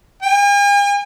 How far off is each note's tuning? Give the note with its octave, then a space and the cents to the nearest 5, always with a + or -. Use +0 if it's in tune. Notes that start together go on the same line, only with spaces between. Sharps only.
G#5 -45